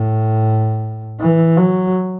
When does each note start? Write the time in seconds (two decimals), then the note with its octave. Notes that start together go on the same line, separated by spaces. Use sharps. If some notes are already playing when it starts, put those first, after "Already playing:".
Already playing: A2
1.20 E3
1.57 F#3